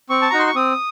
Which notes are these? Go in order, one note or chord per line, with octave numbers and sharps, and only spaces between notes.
C4 C#6
A5
D#4 F#4 A#5
C6
C#6
C4 D#6